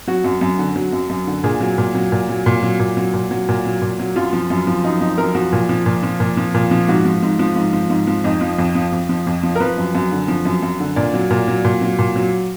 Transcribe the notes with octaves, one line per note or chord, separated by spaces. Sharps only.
F#3 F#4
F#2
F#2
D3
F#3
F#2
F#2
D3
A#2 G#4
F#3
A#2
F#3
A#2
F#3
A#2
F#3
A#2
F#3
A#2
F#3
A#2
F#3
A#2
F#3
F#2 F4
F3
F#2
F3
F#2 D#4
F3 D#4
F#2 A#4
F3 F#4
A#2
F3
A#2
F3
A#2
F3
A#2
F3
G#2 F#4
F3
G#2
F3
G#2
F3
G#2
F3
F2 D#4
F3
F2
F3
F2
F3
F2
F3
A#4
F3 B4
F#2
F#2
D3
F3
F#2
F#2
D3
A#2 D5
F#3
A#2
F#3
A#2
F#3
A#2
F#3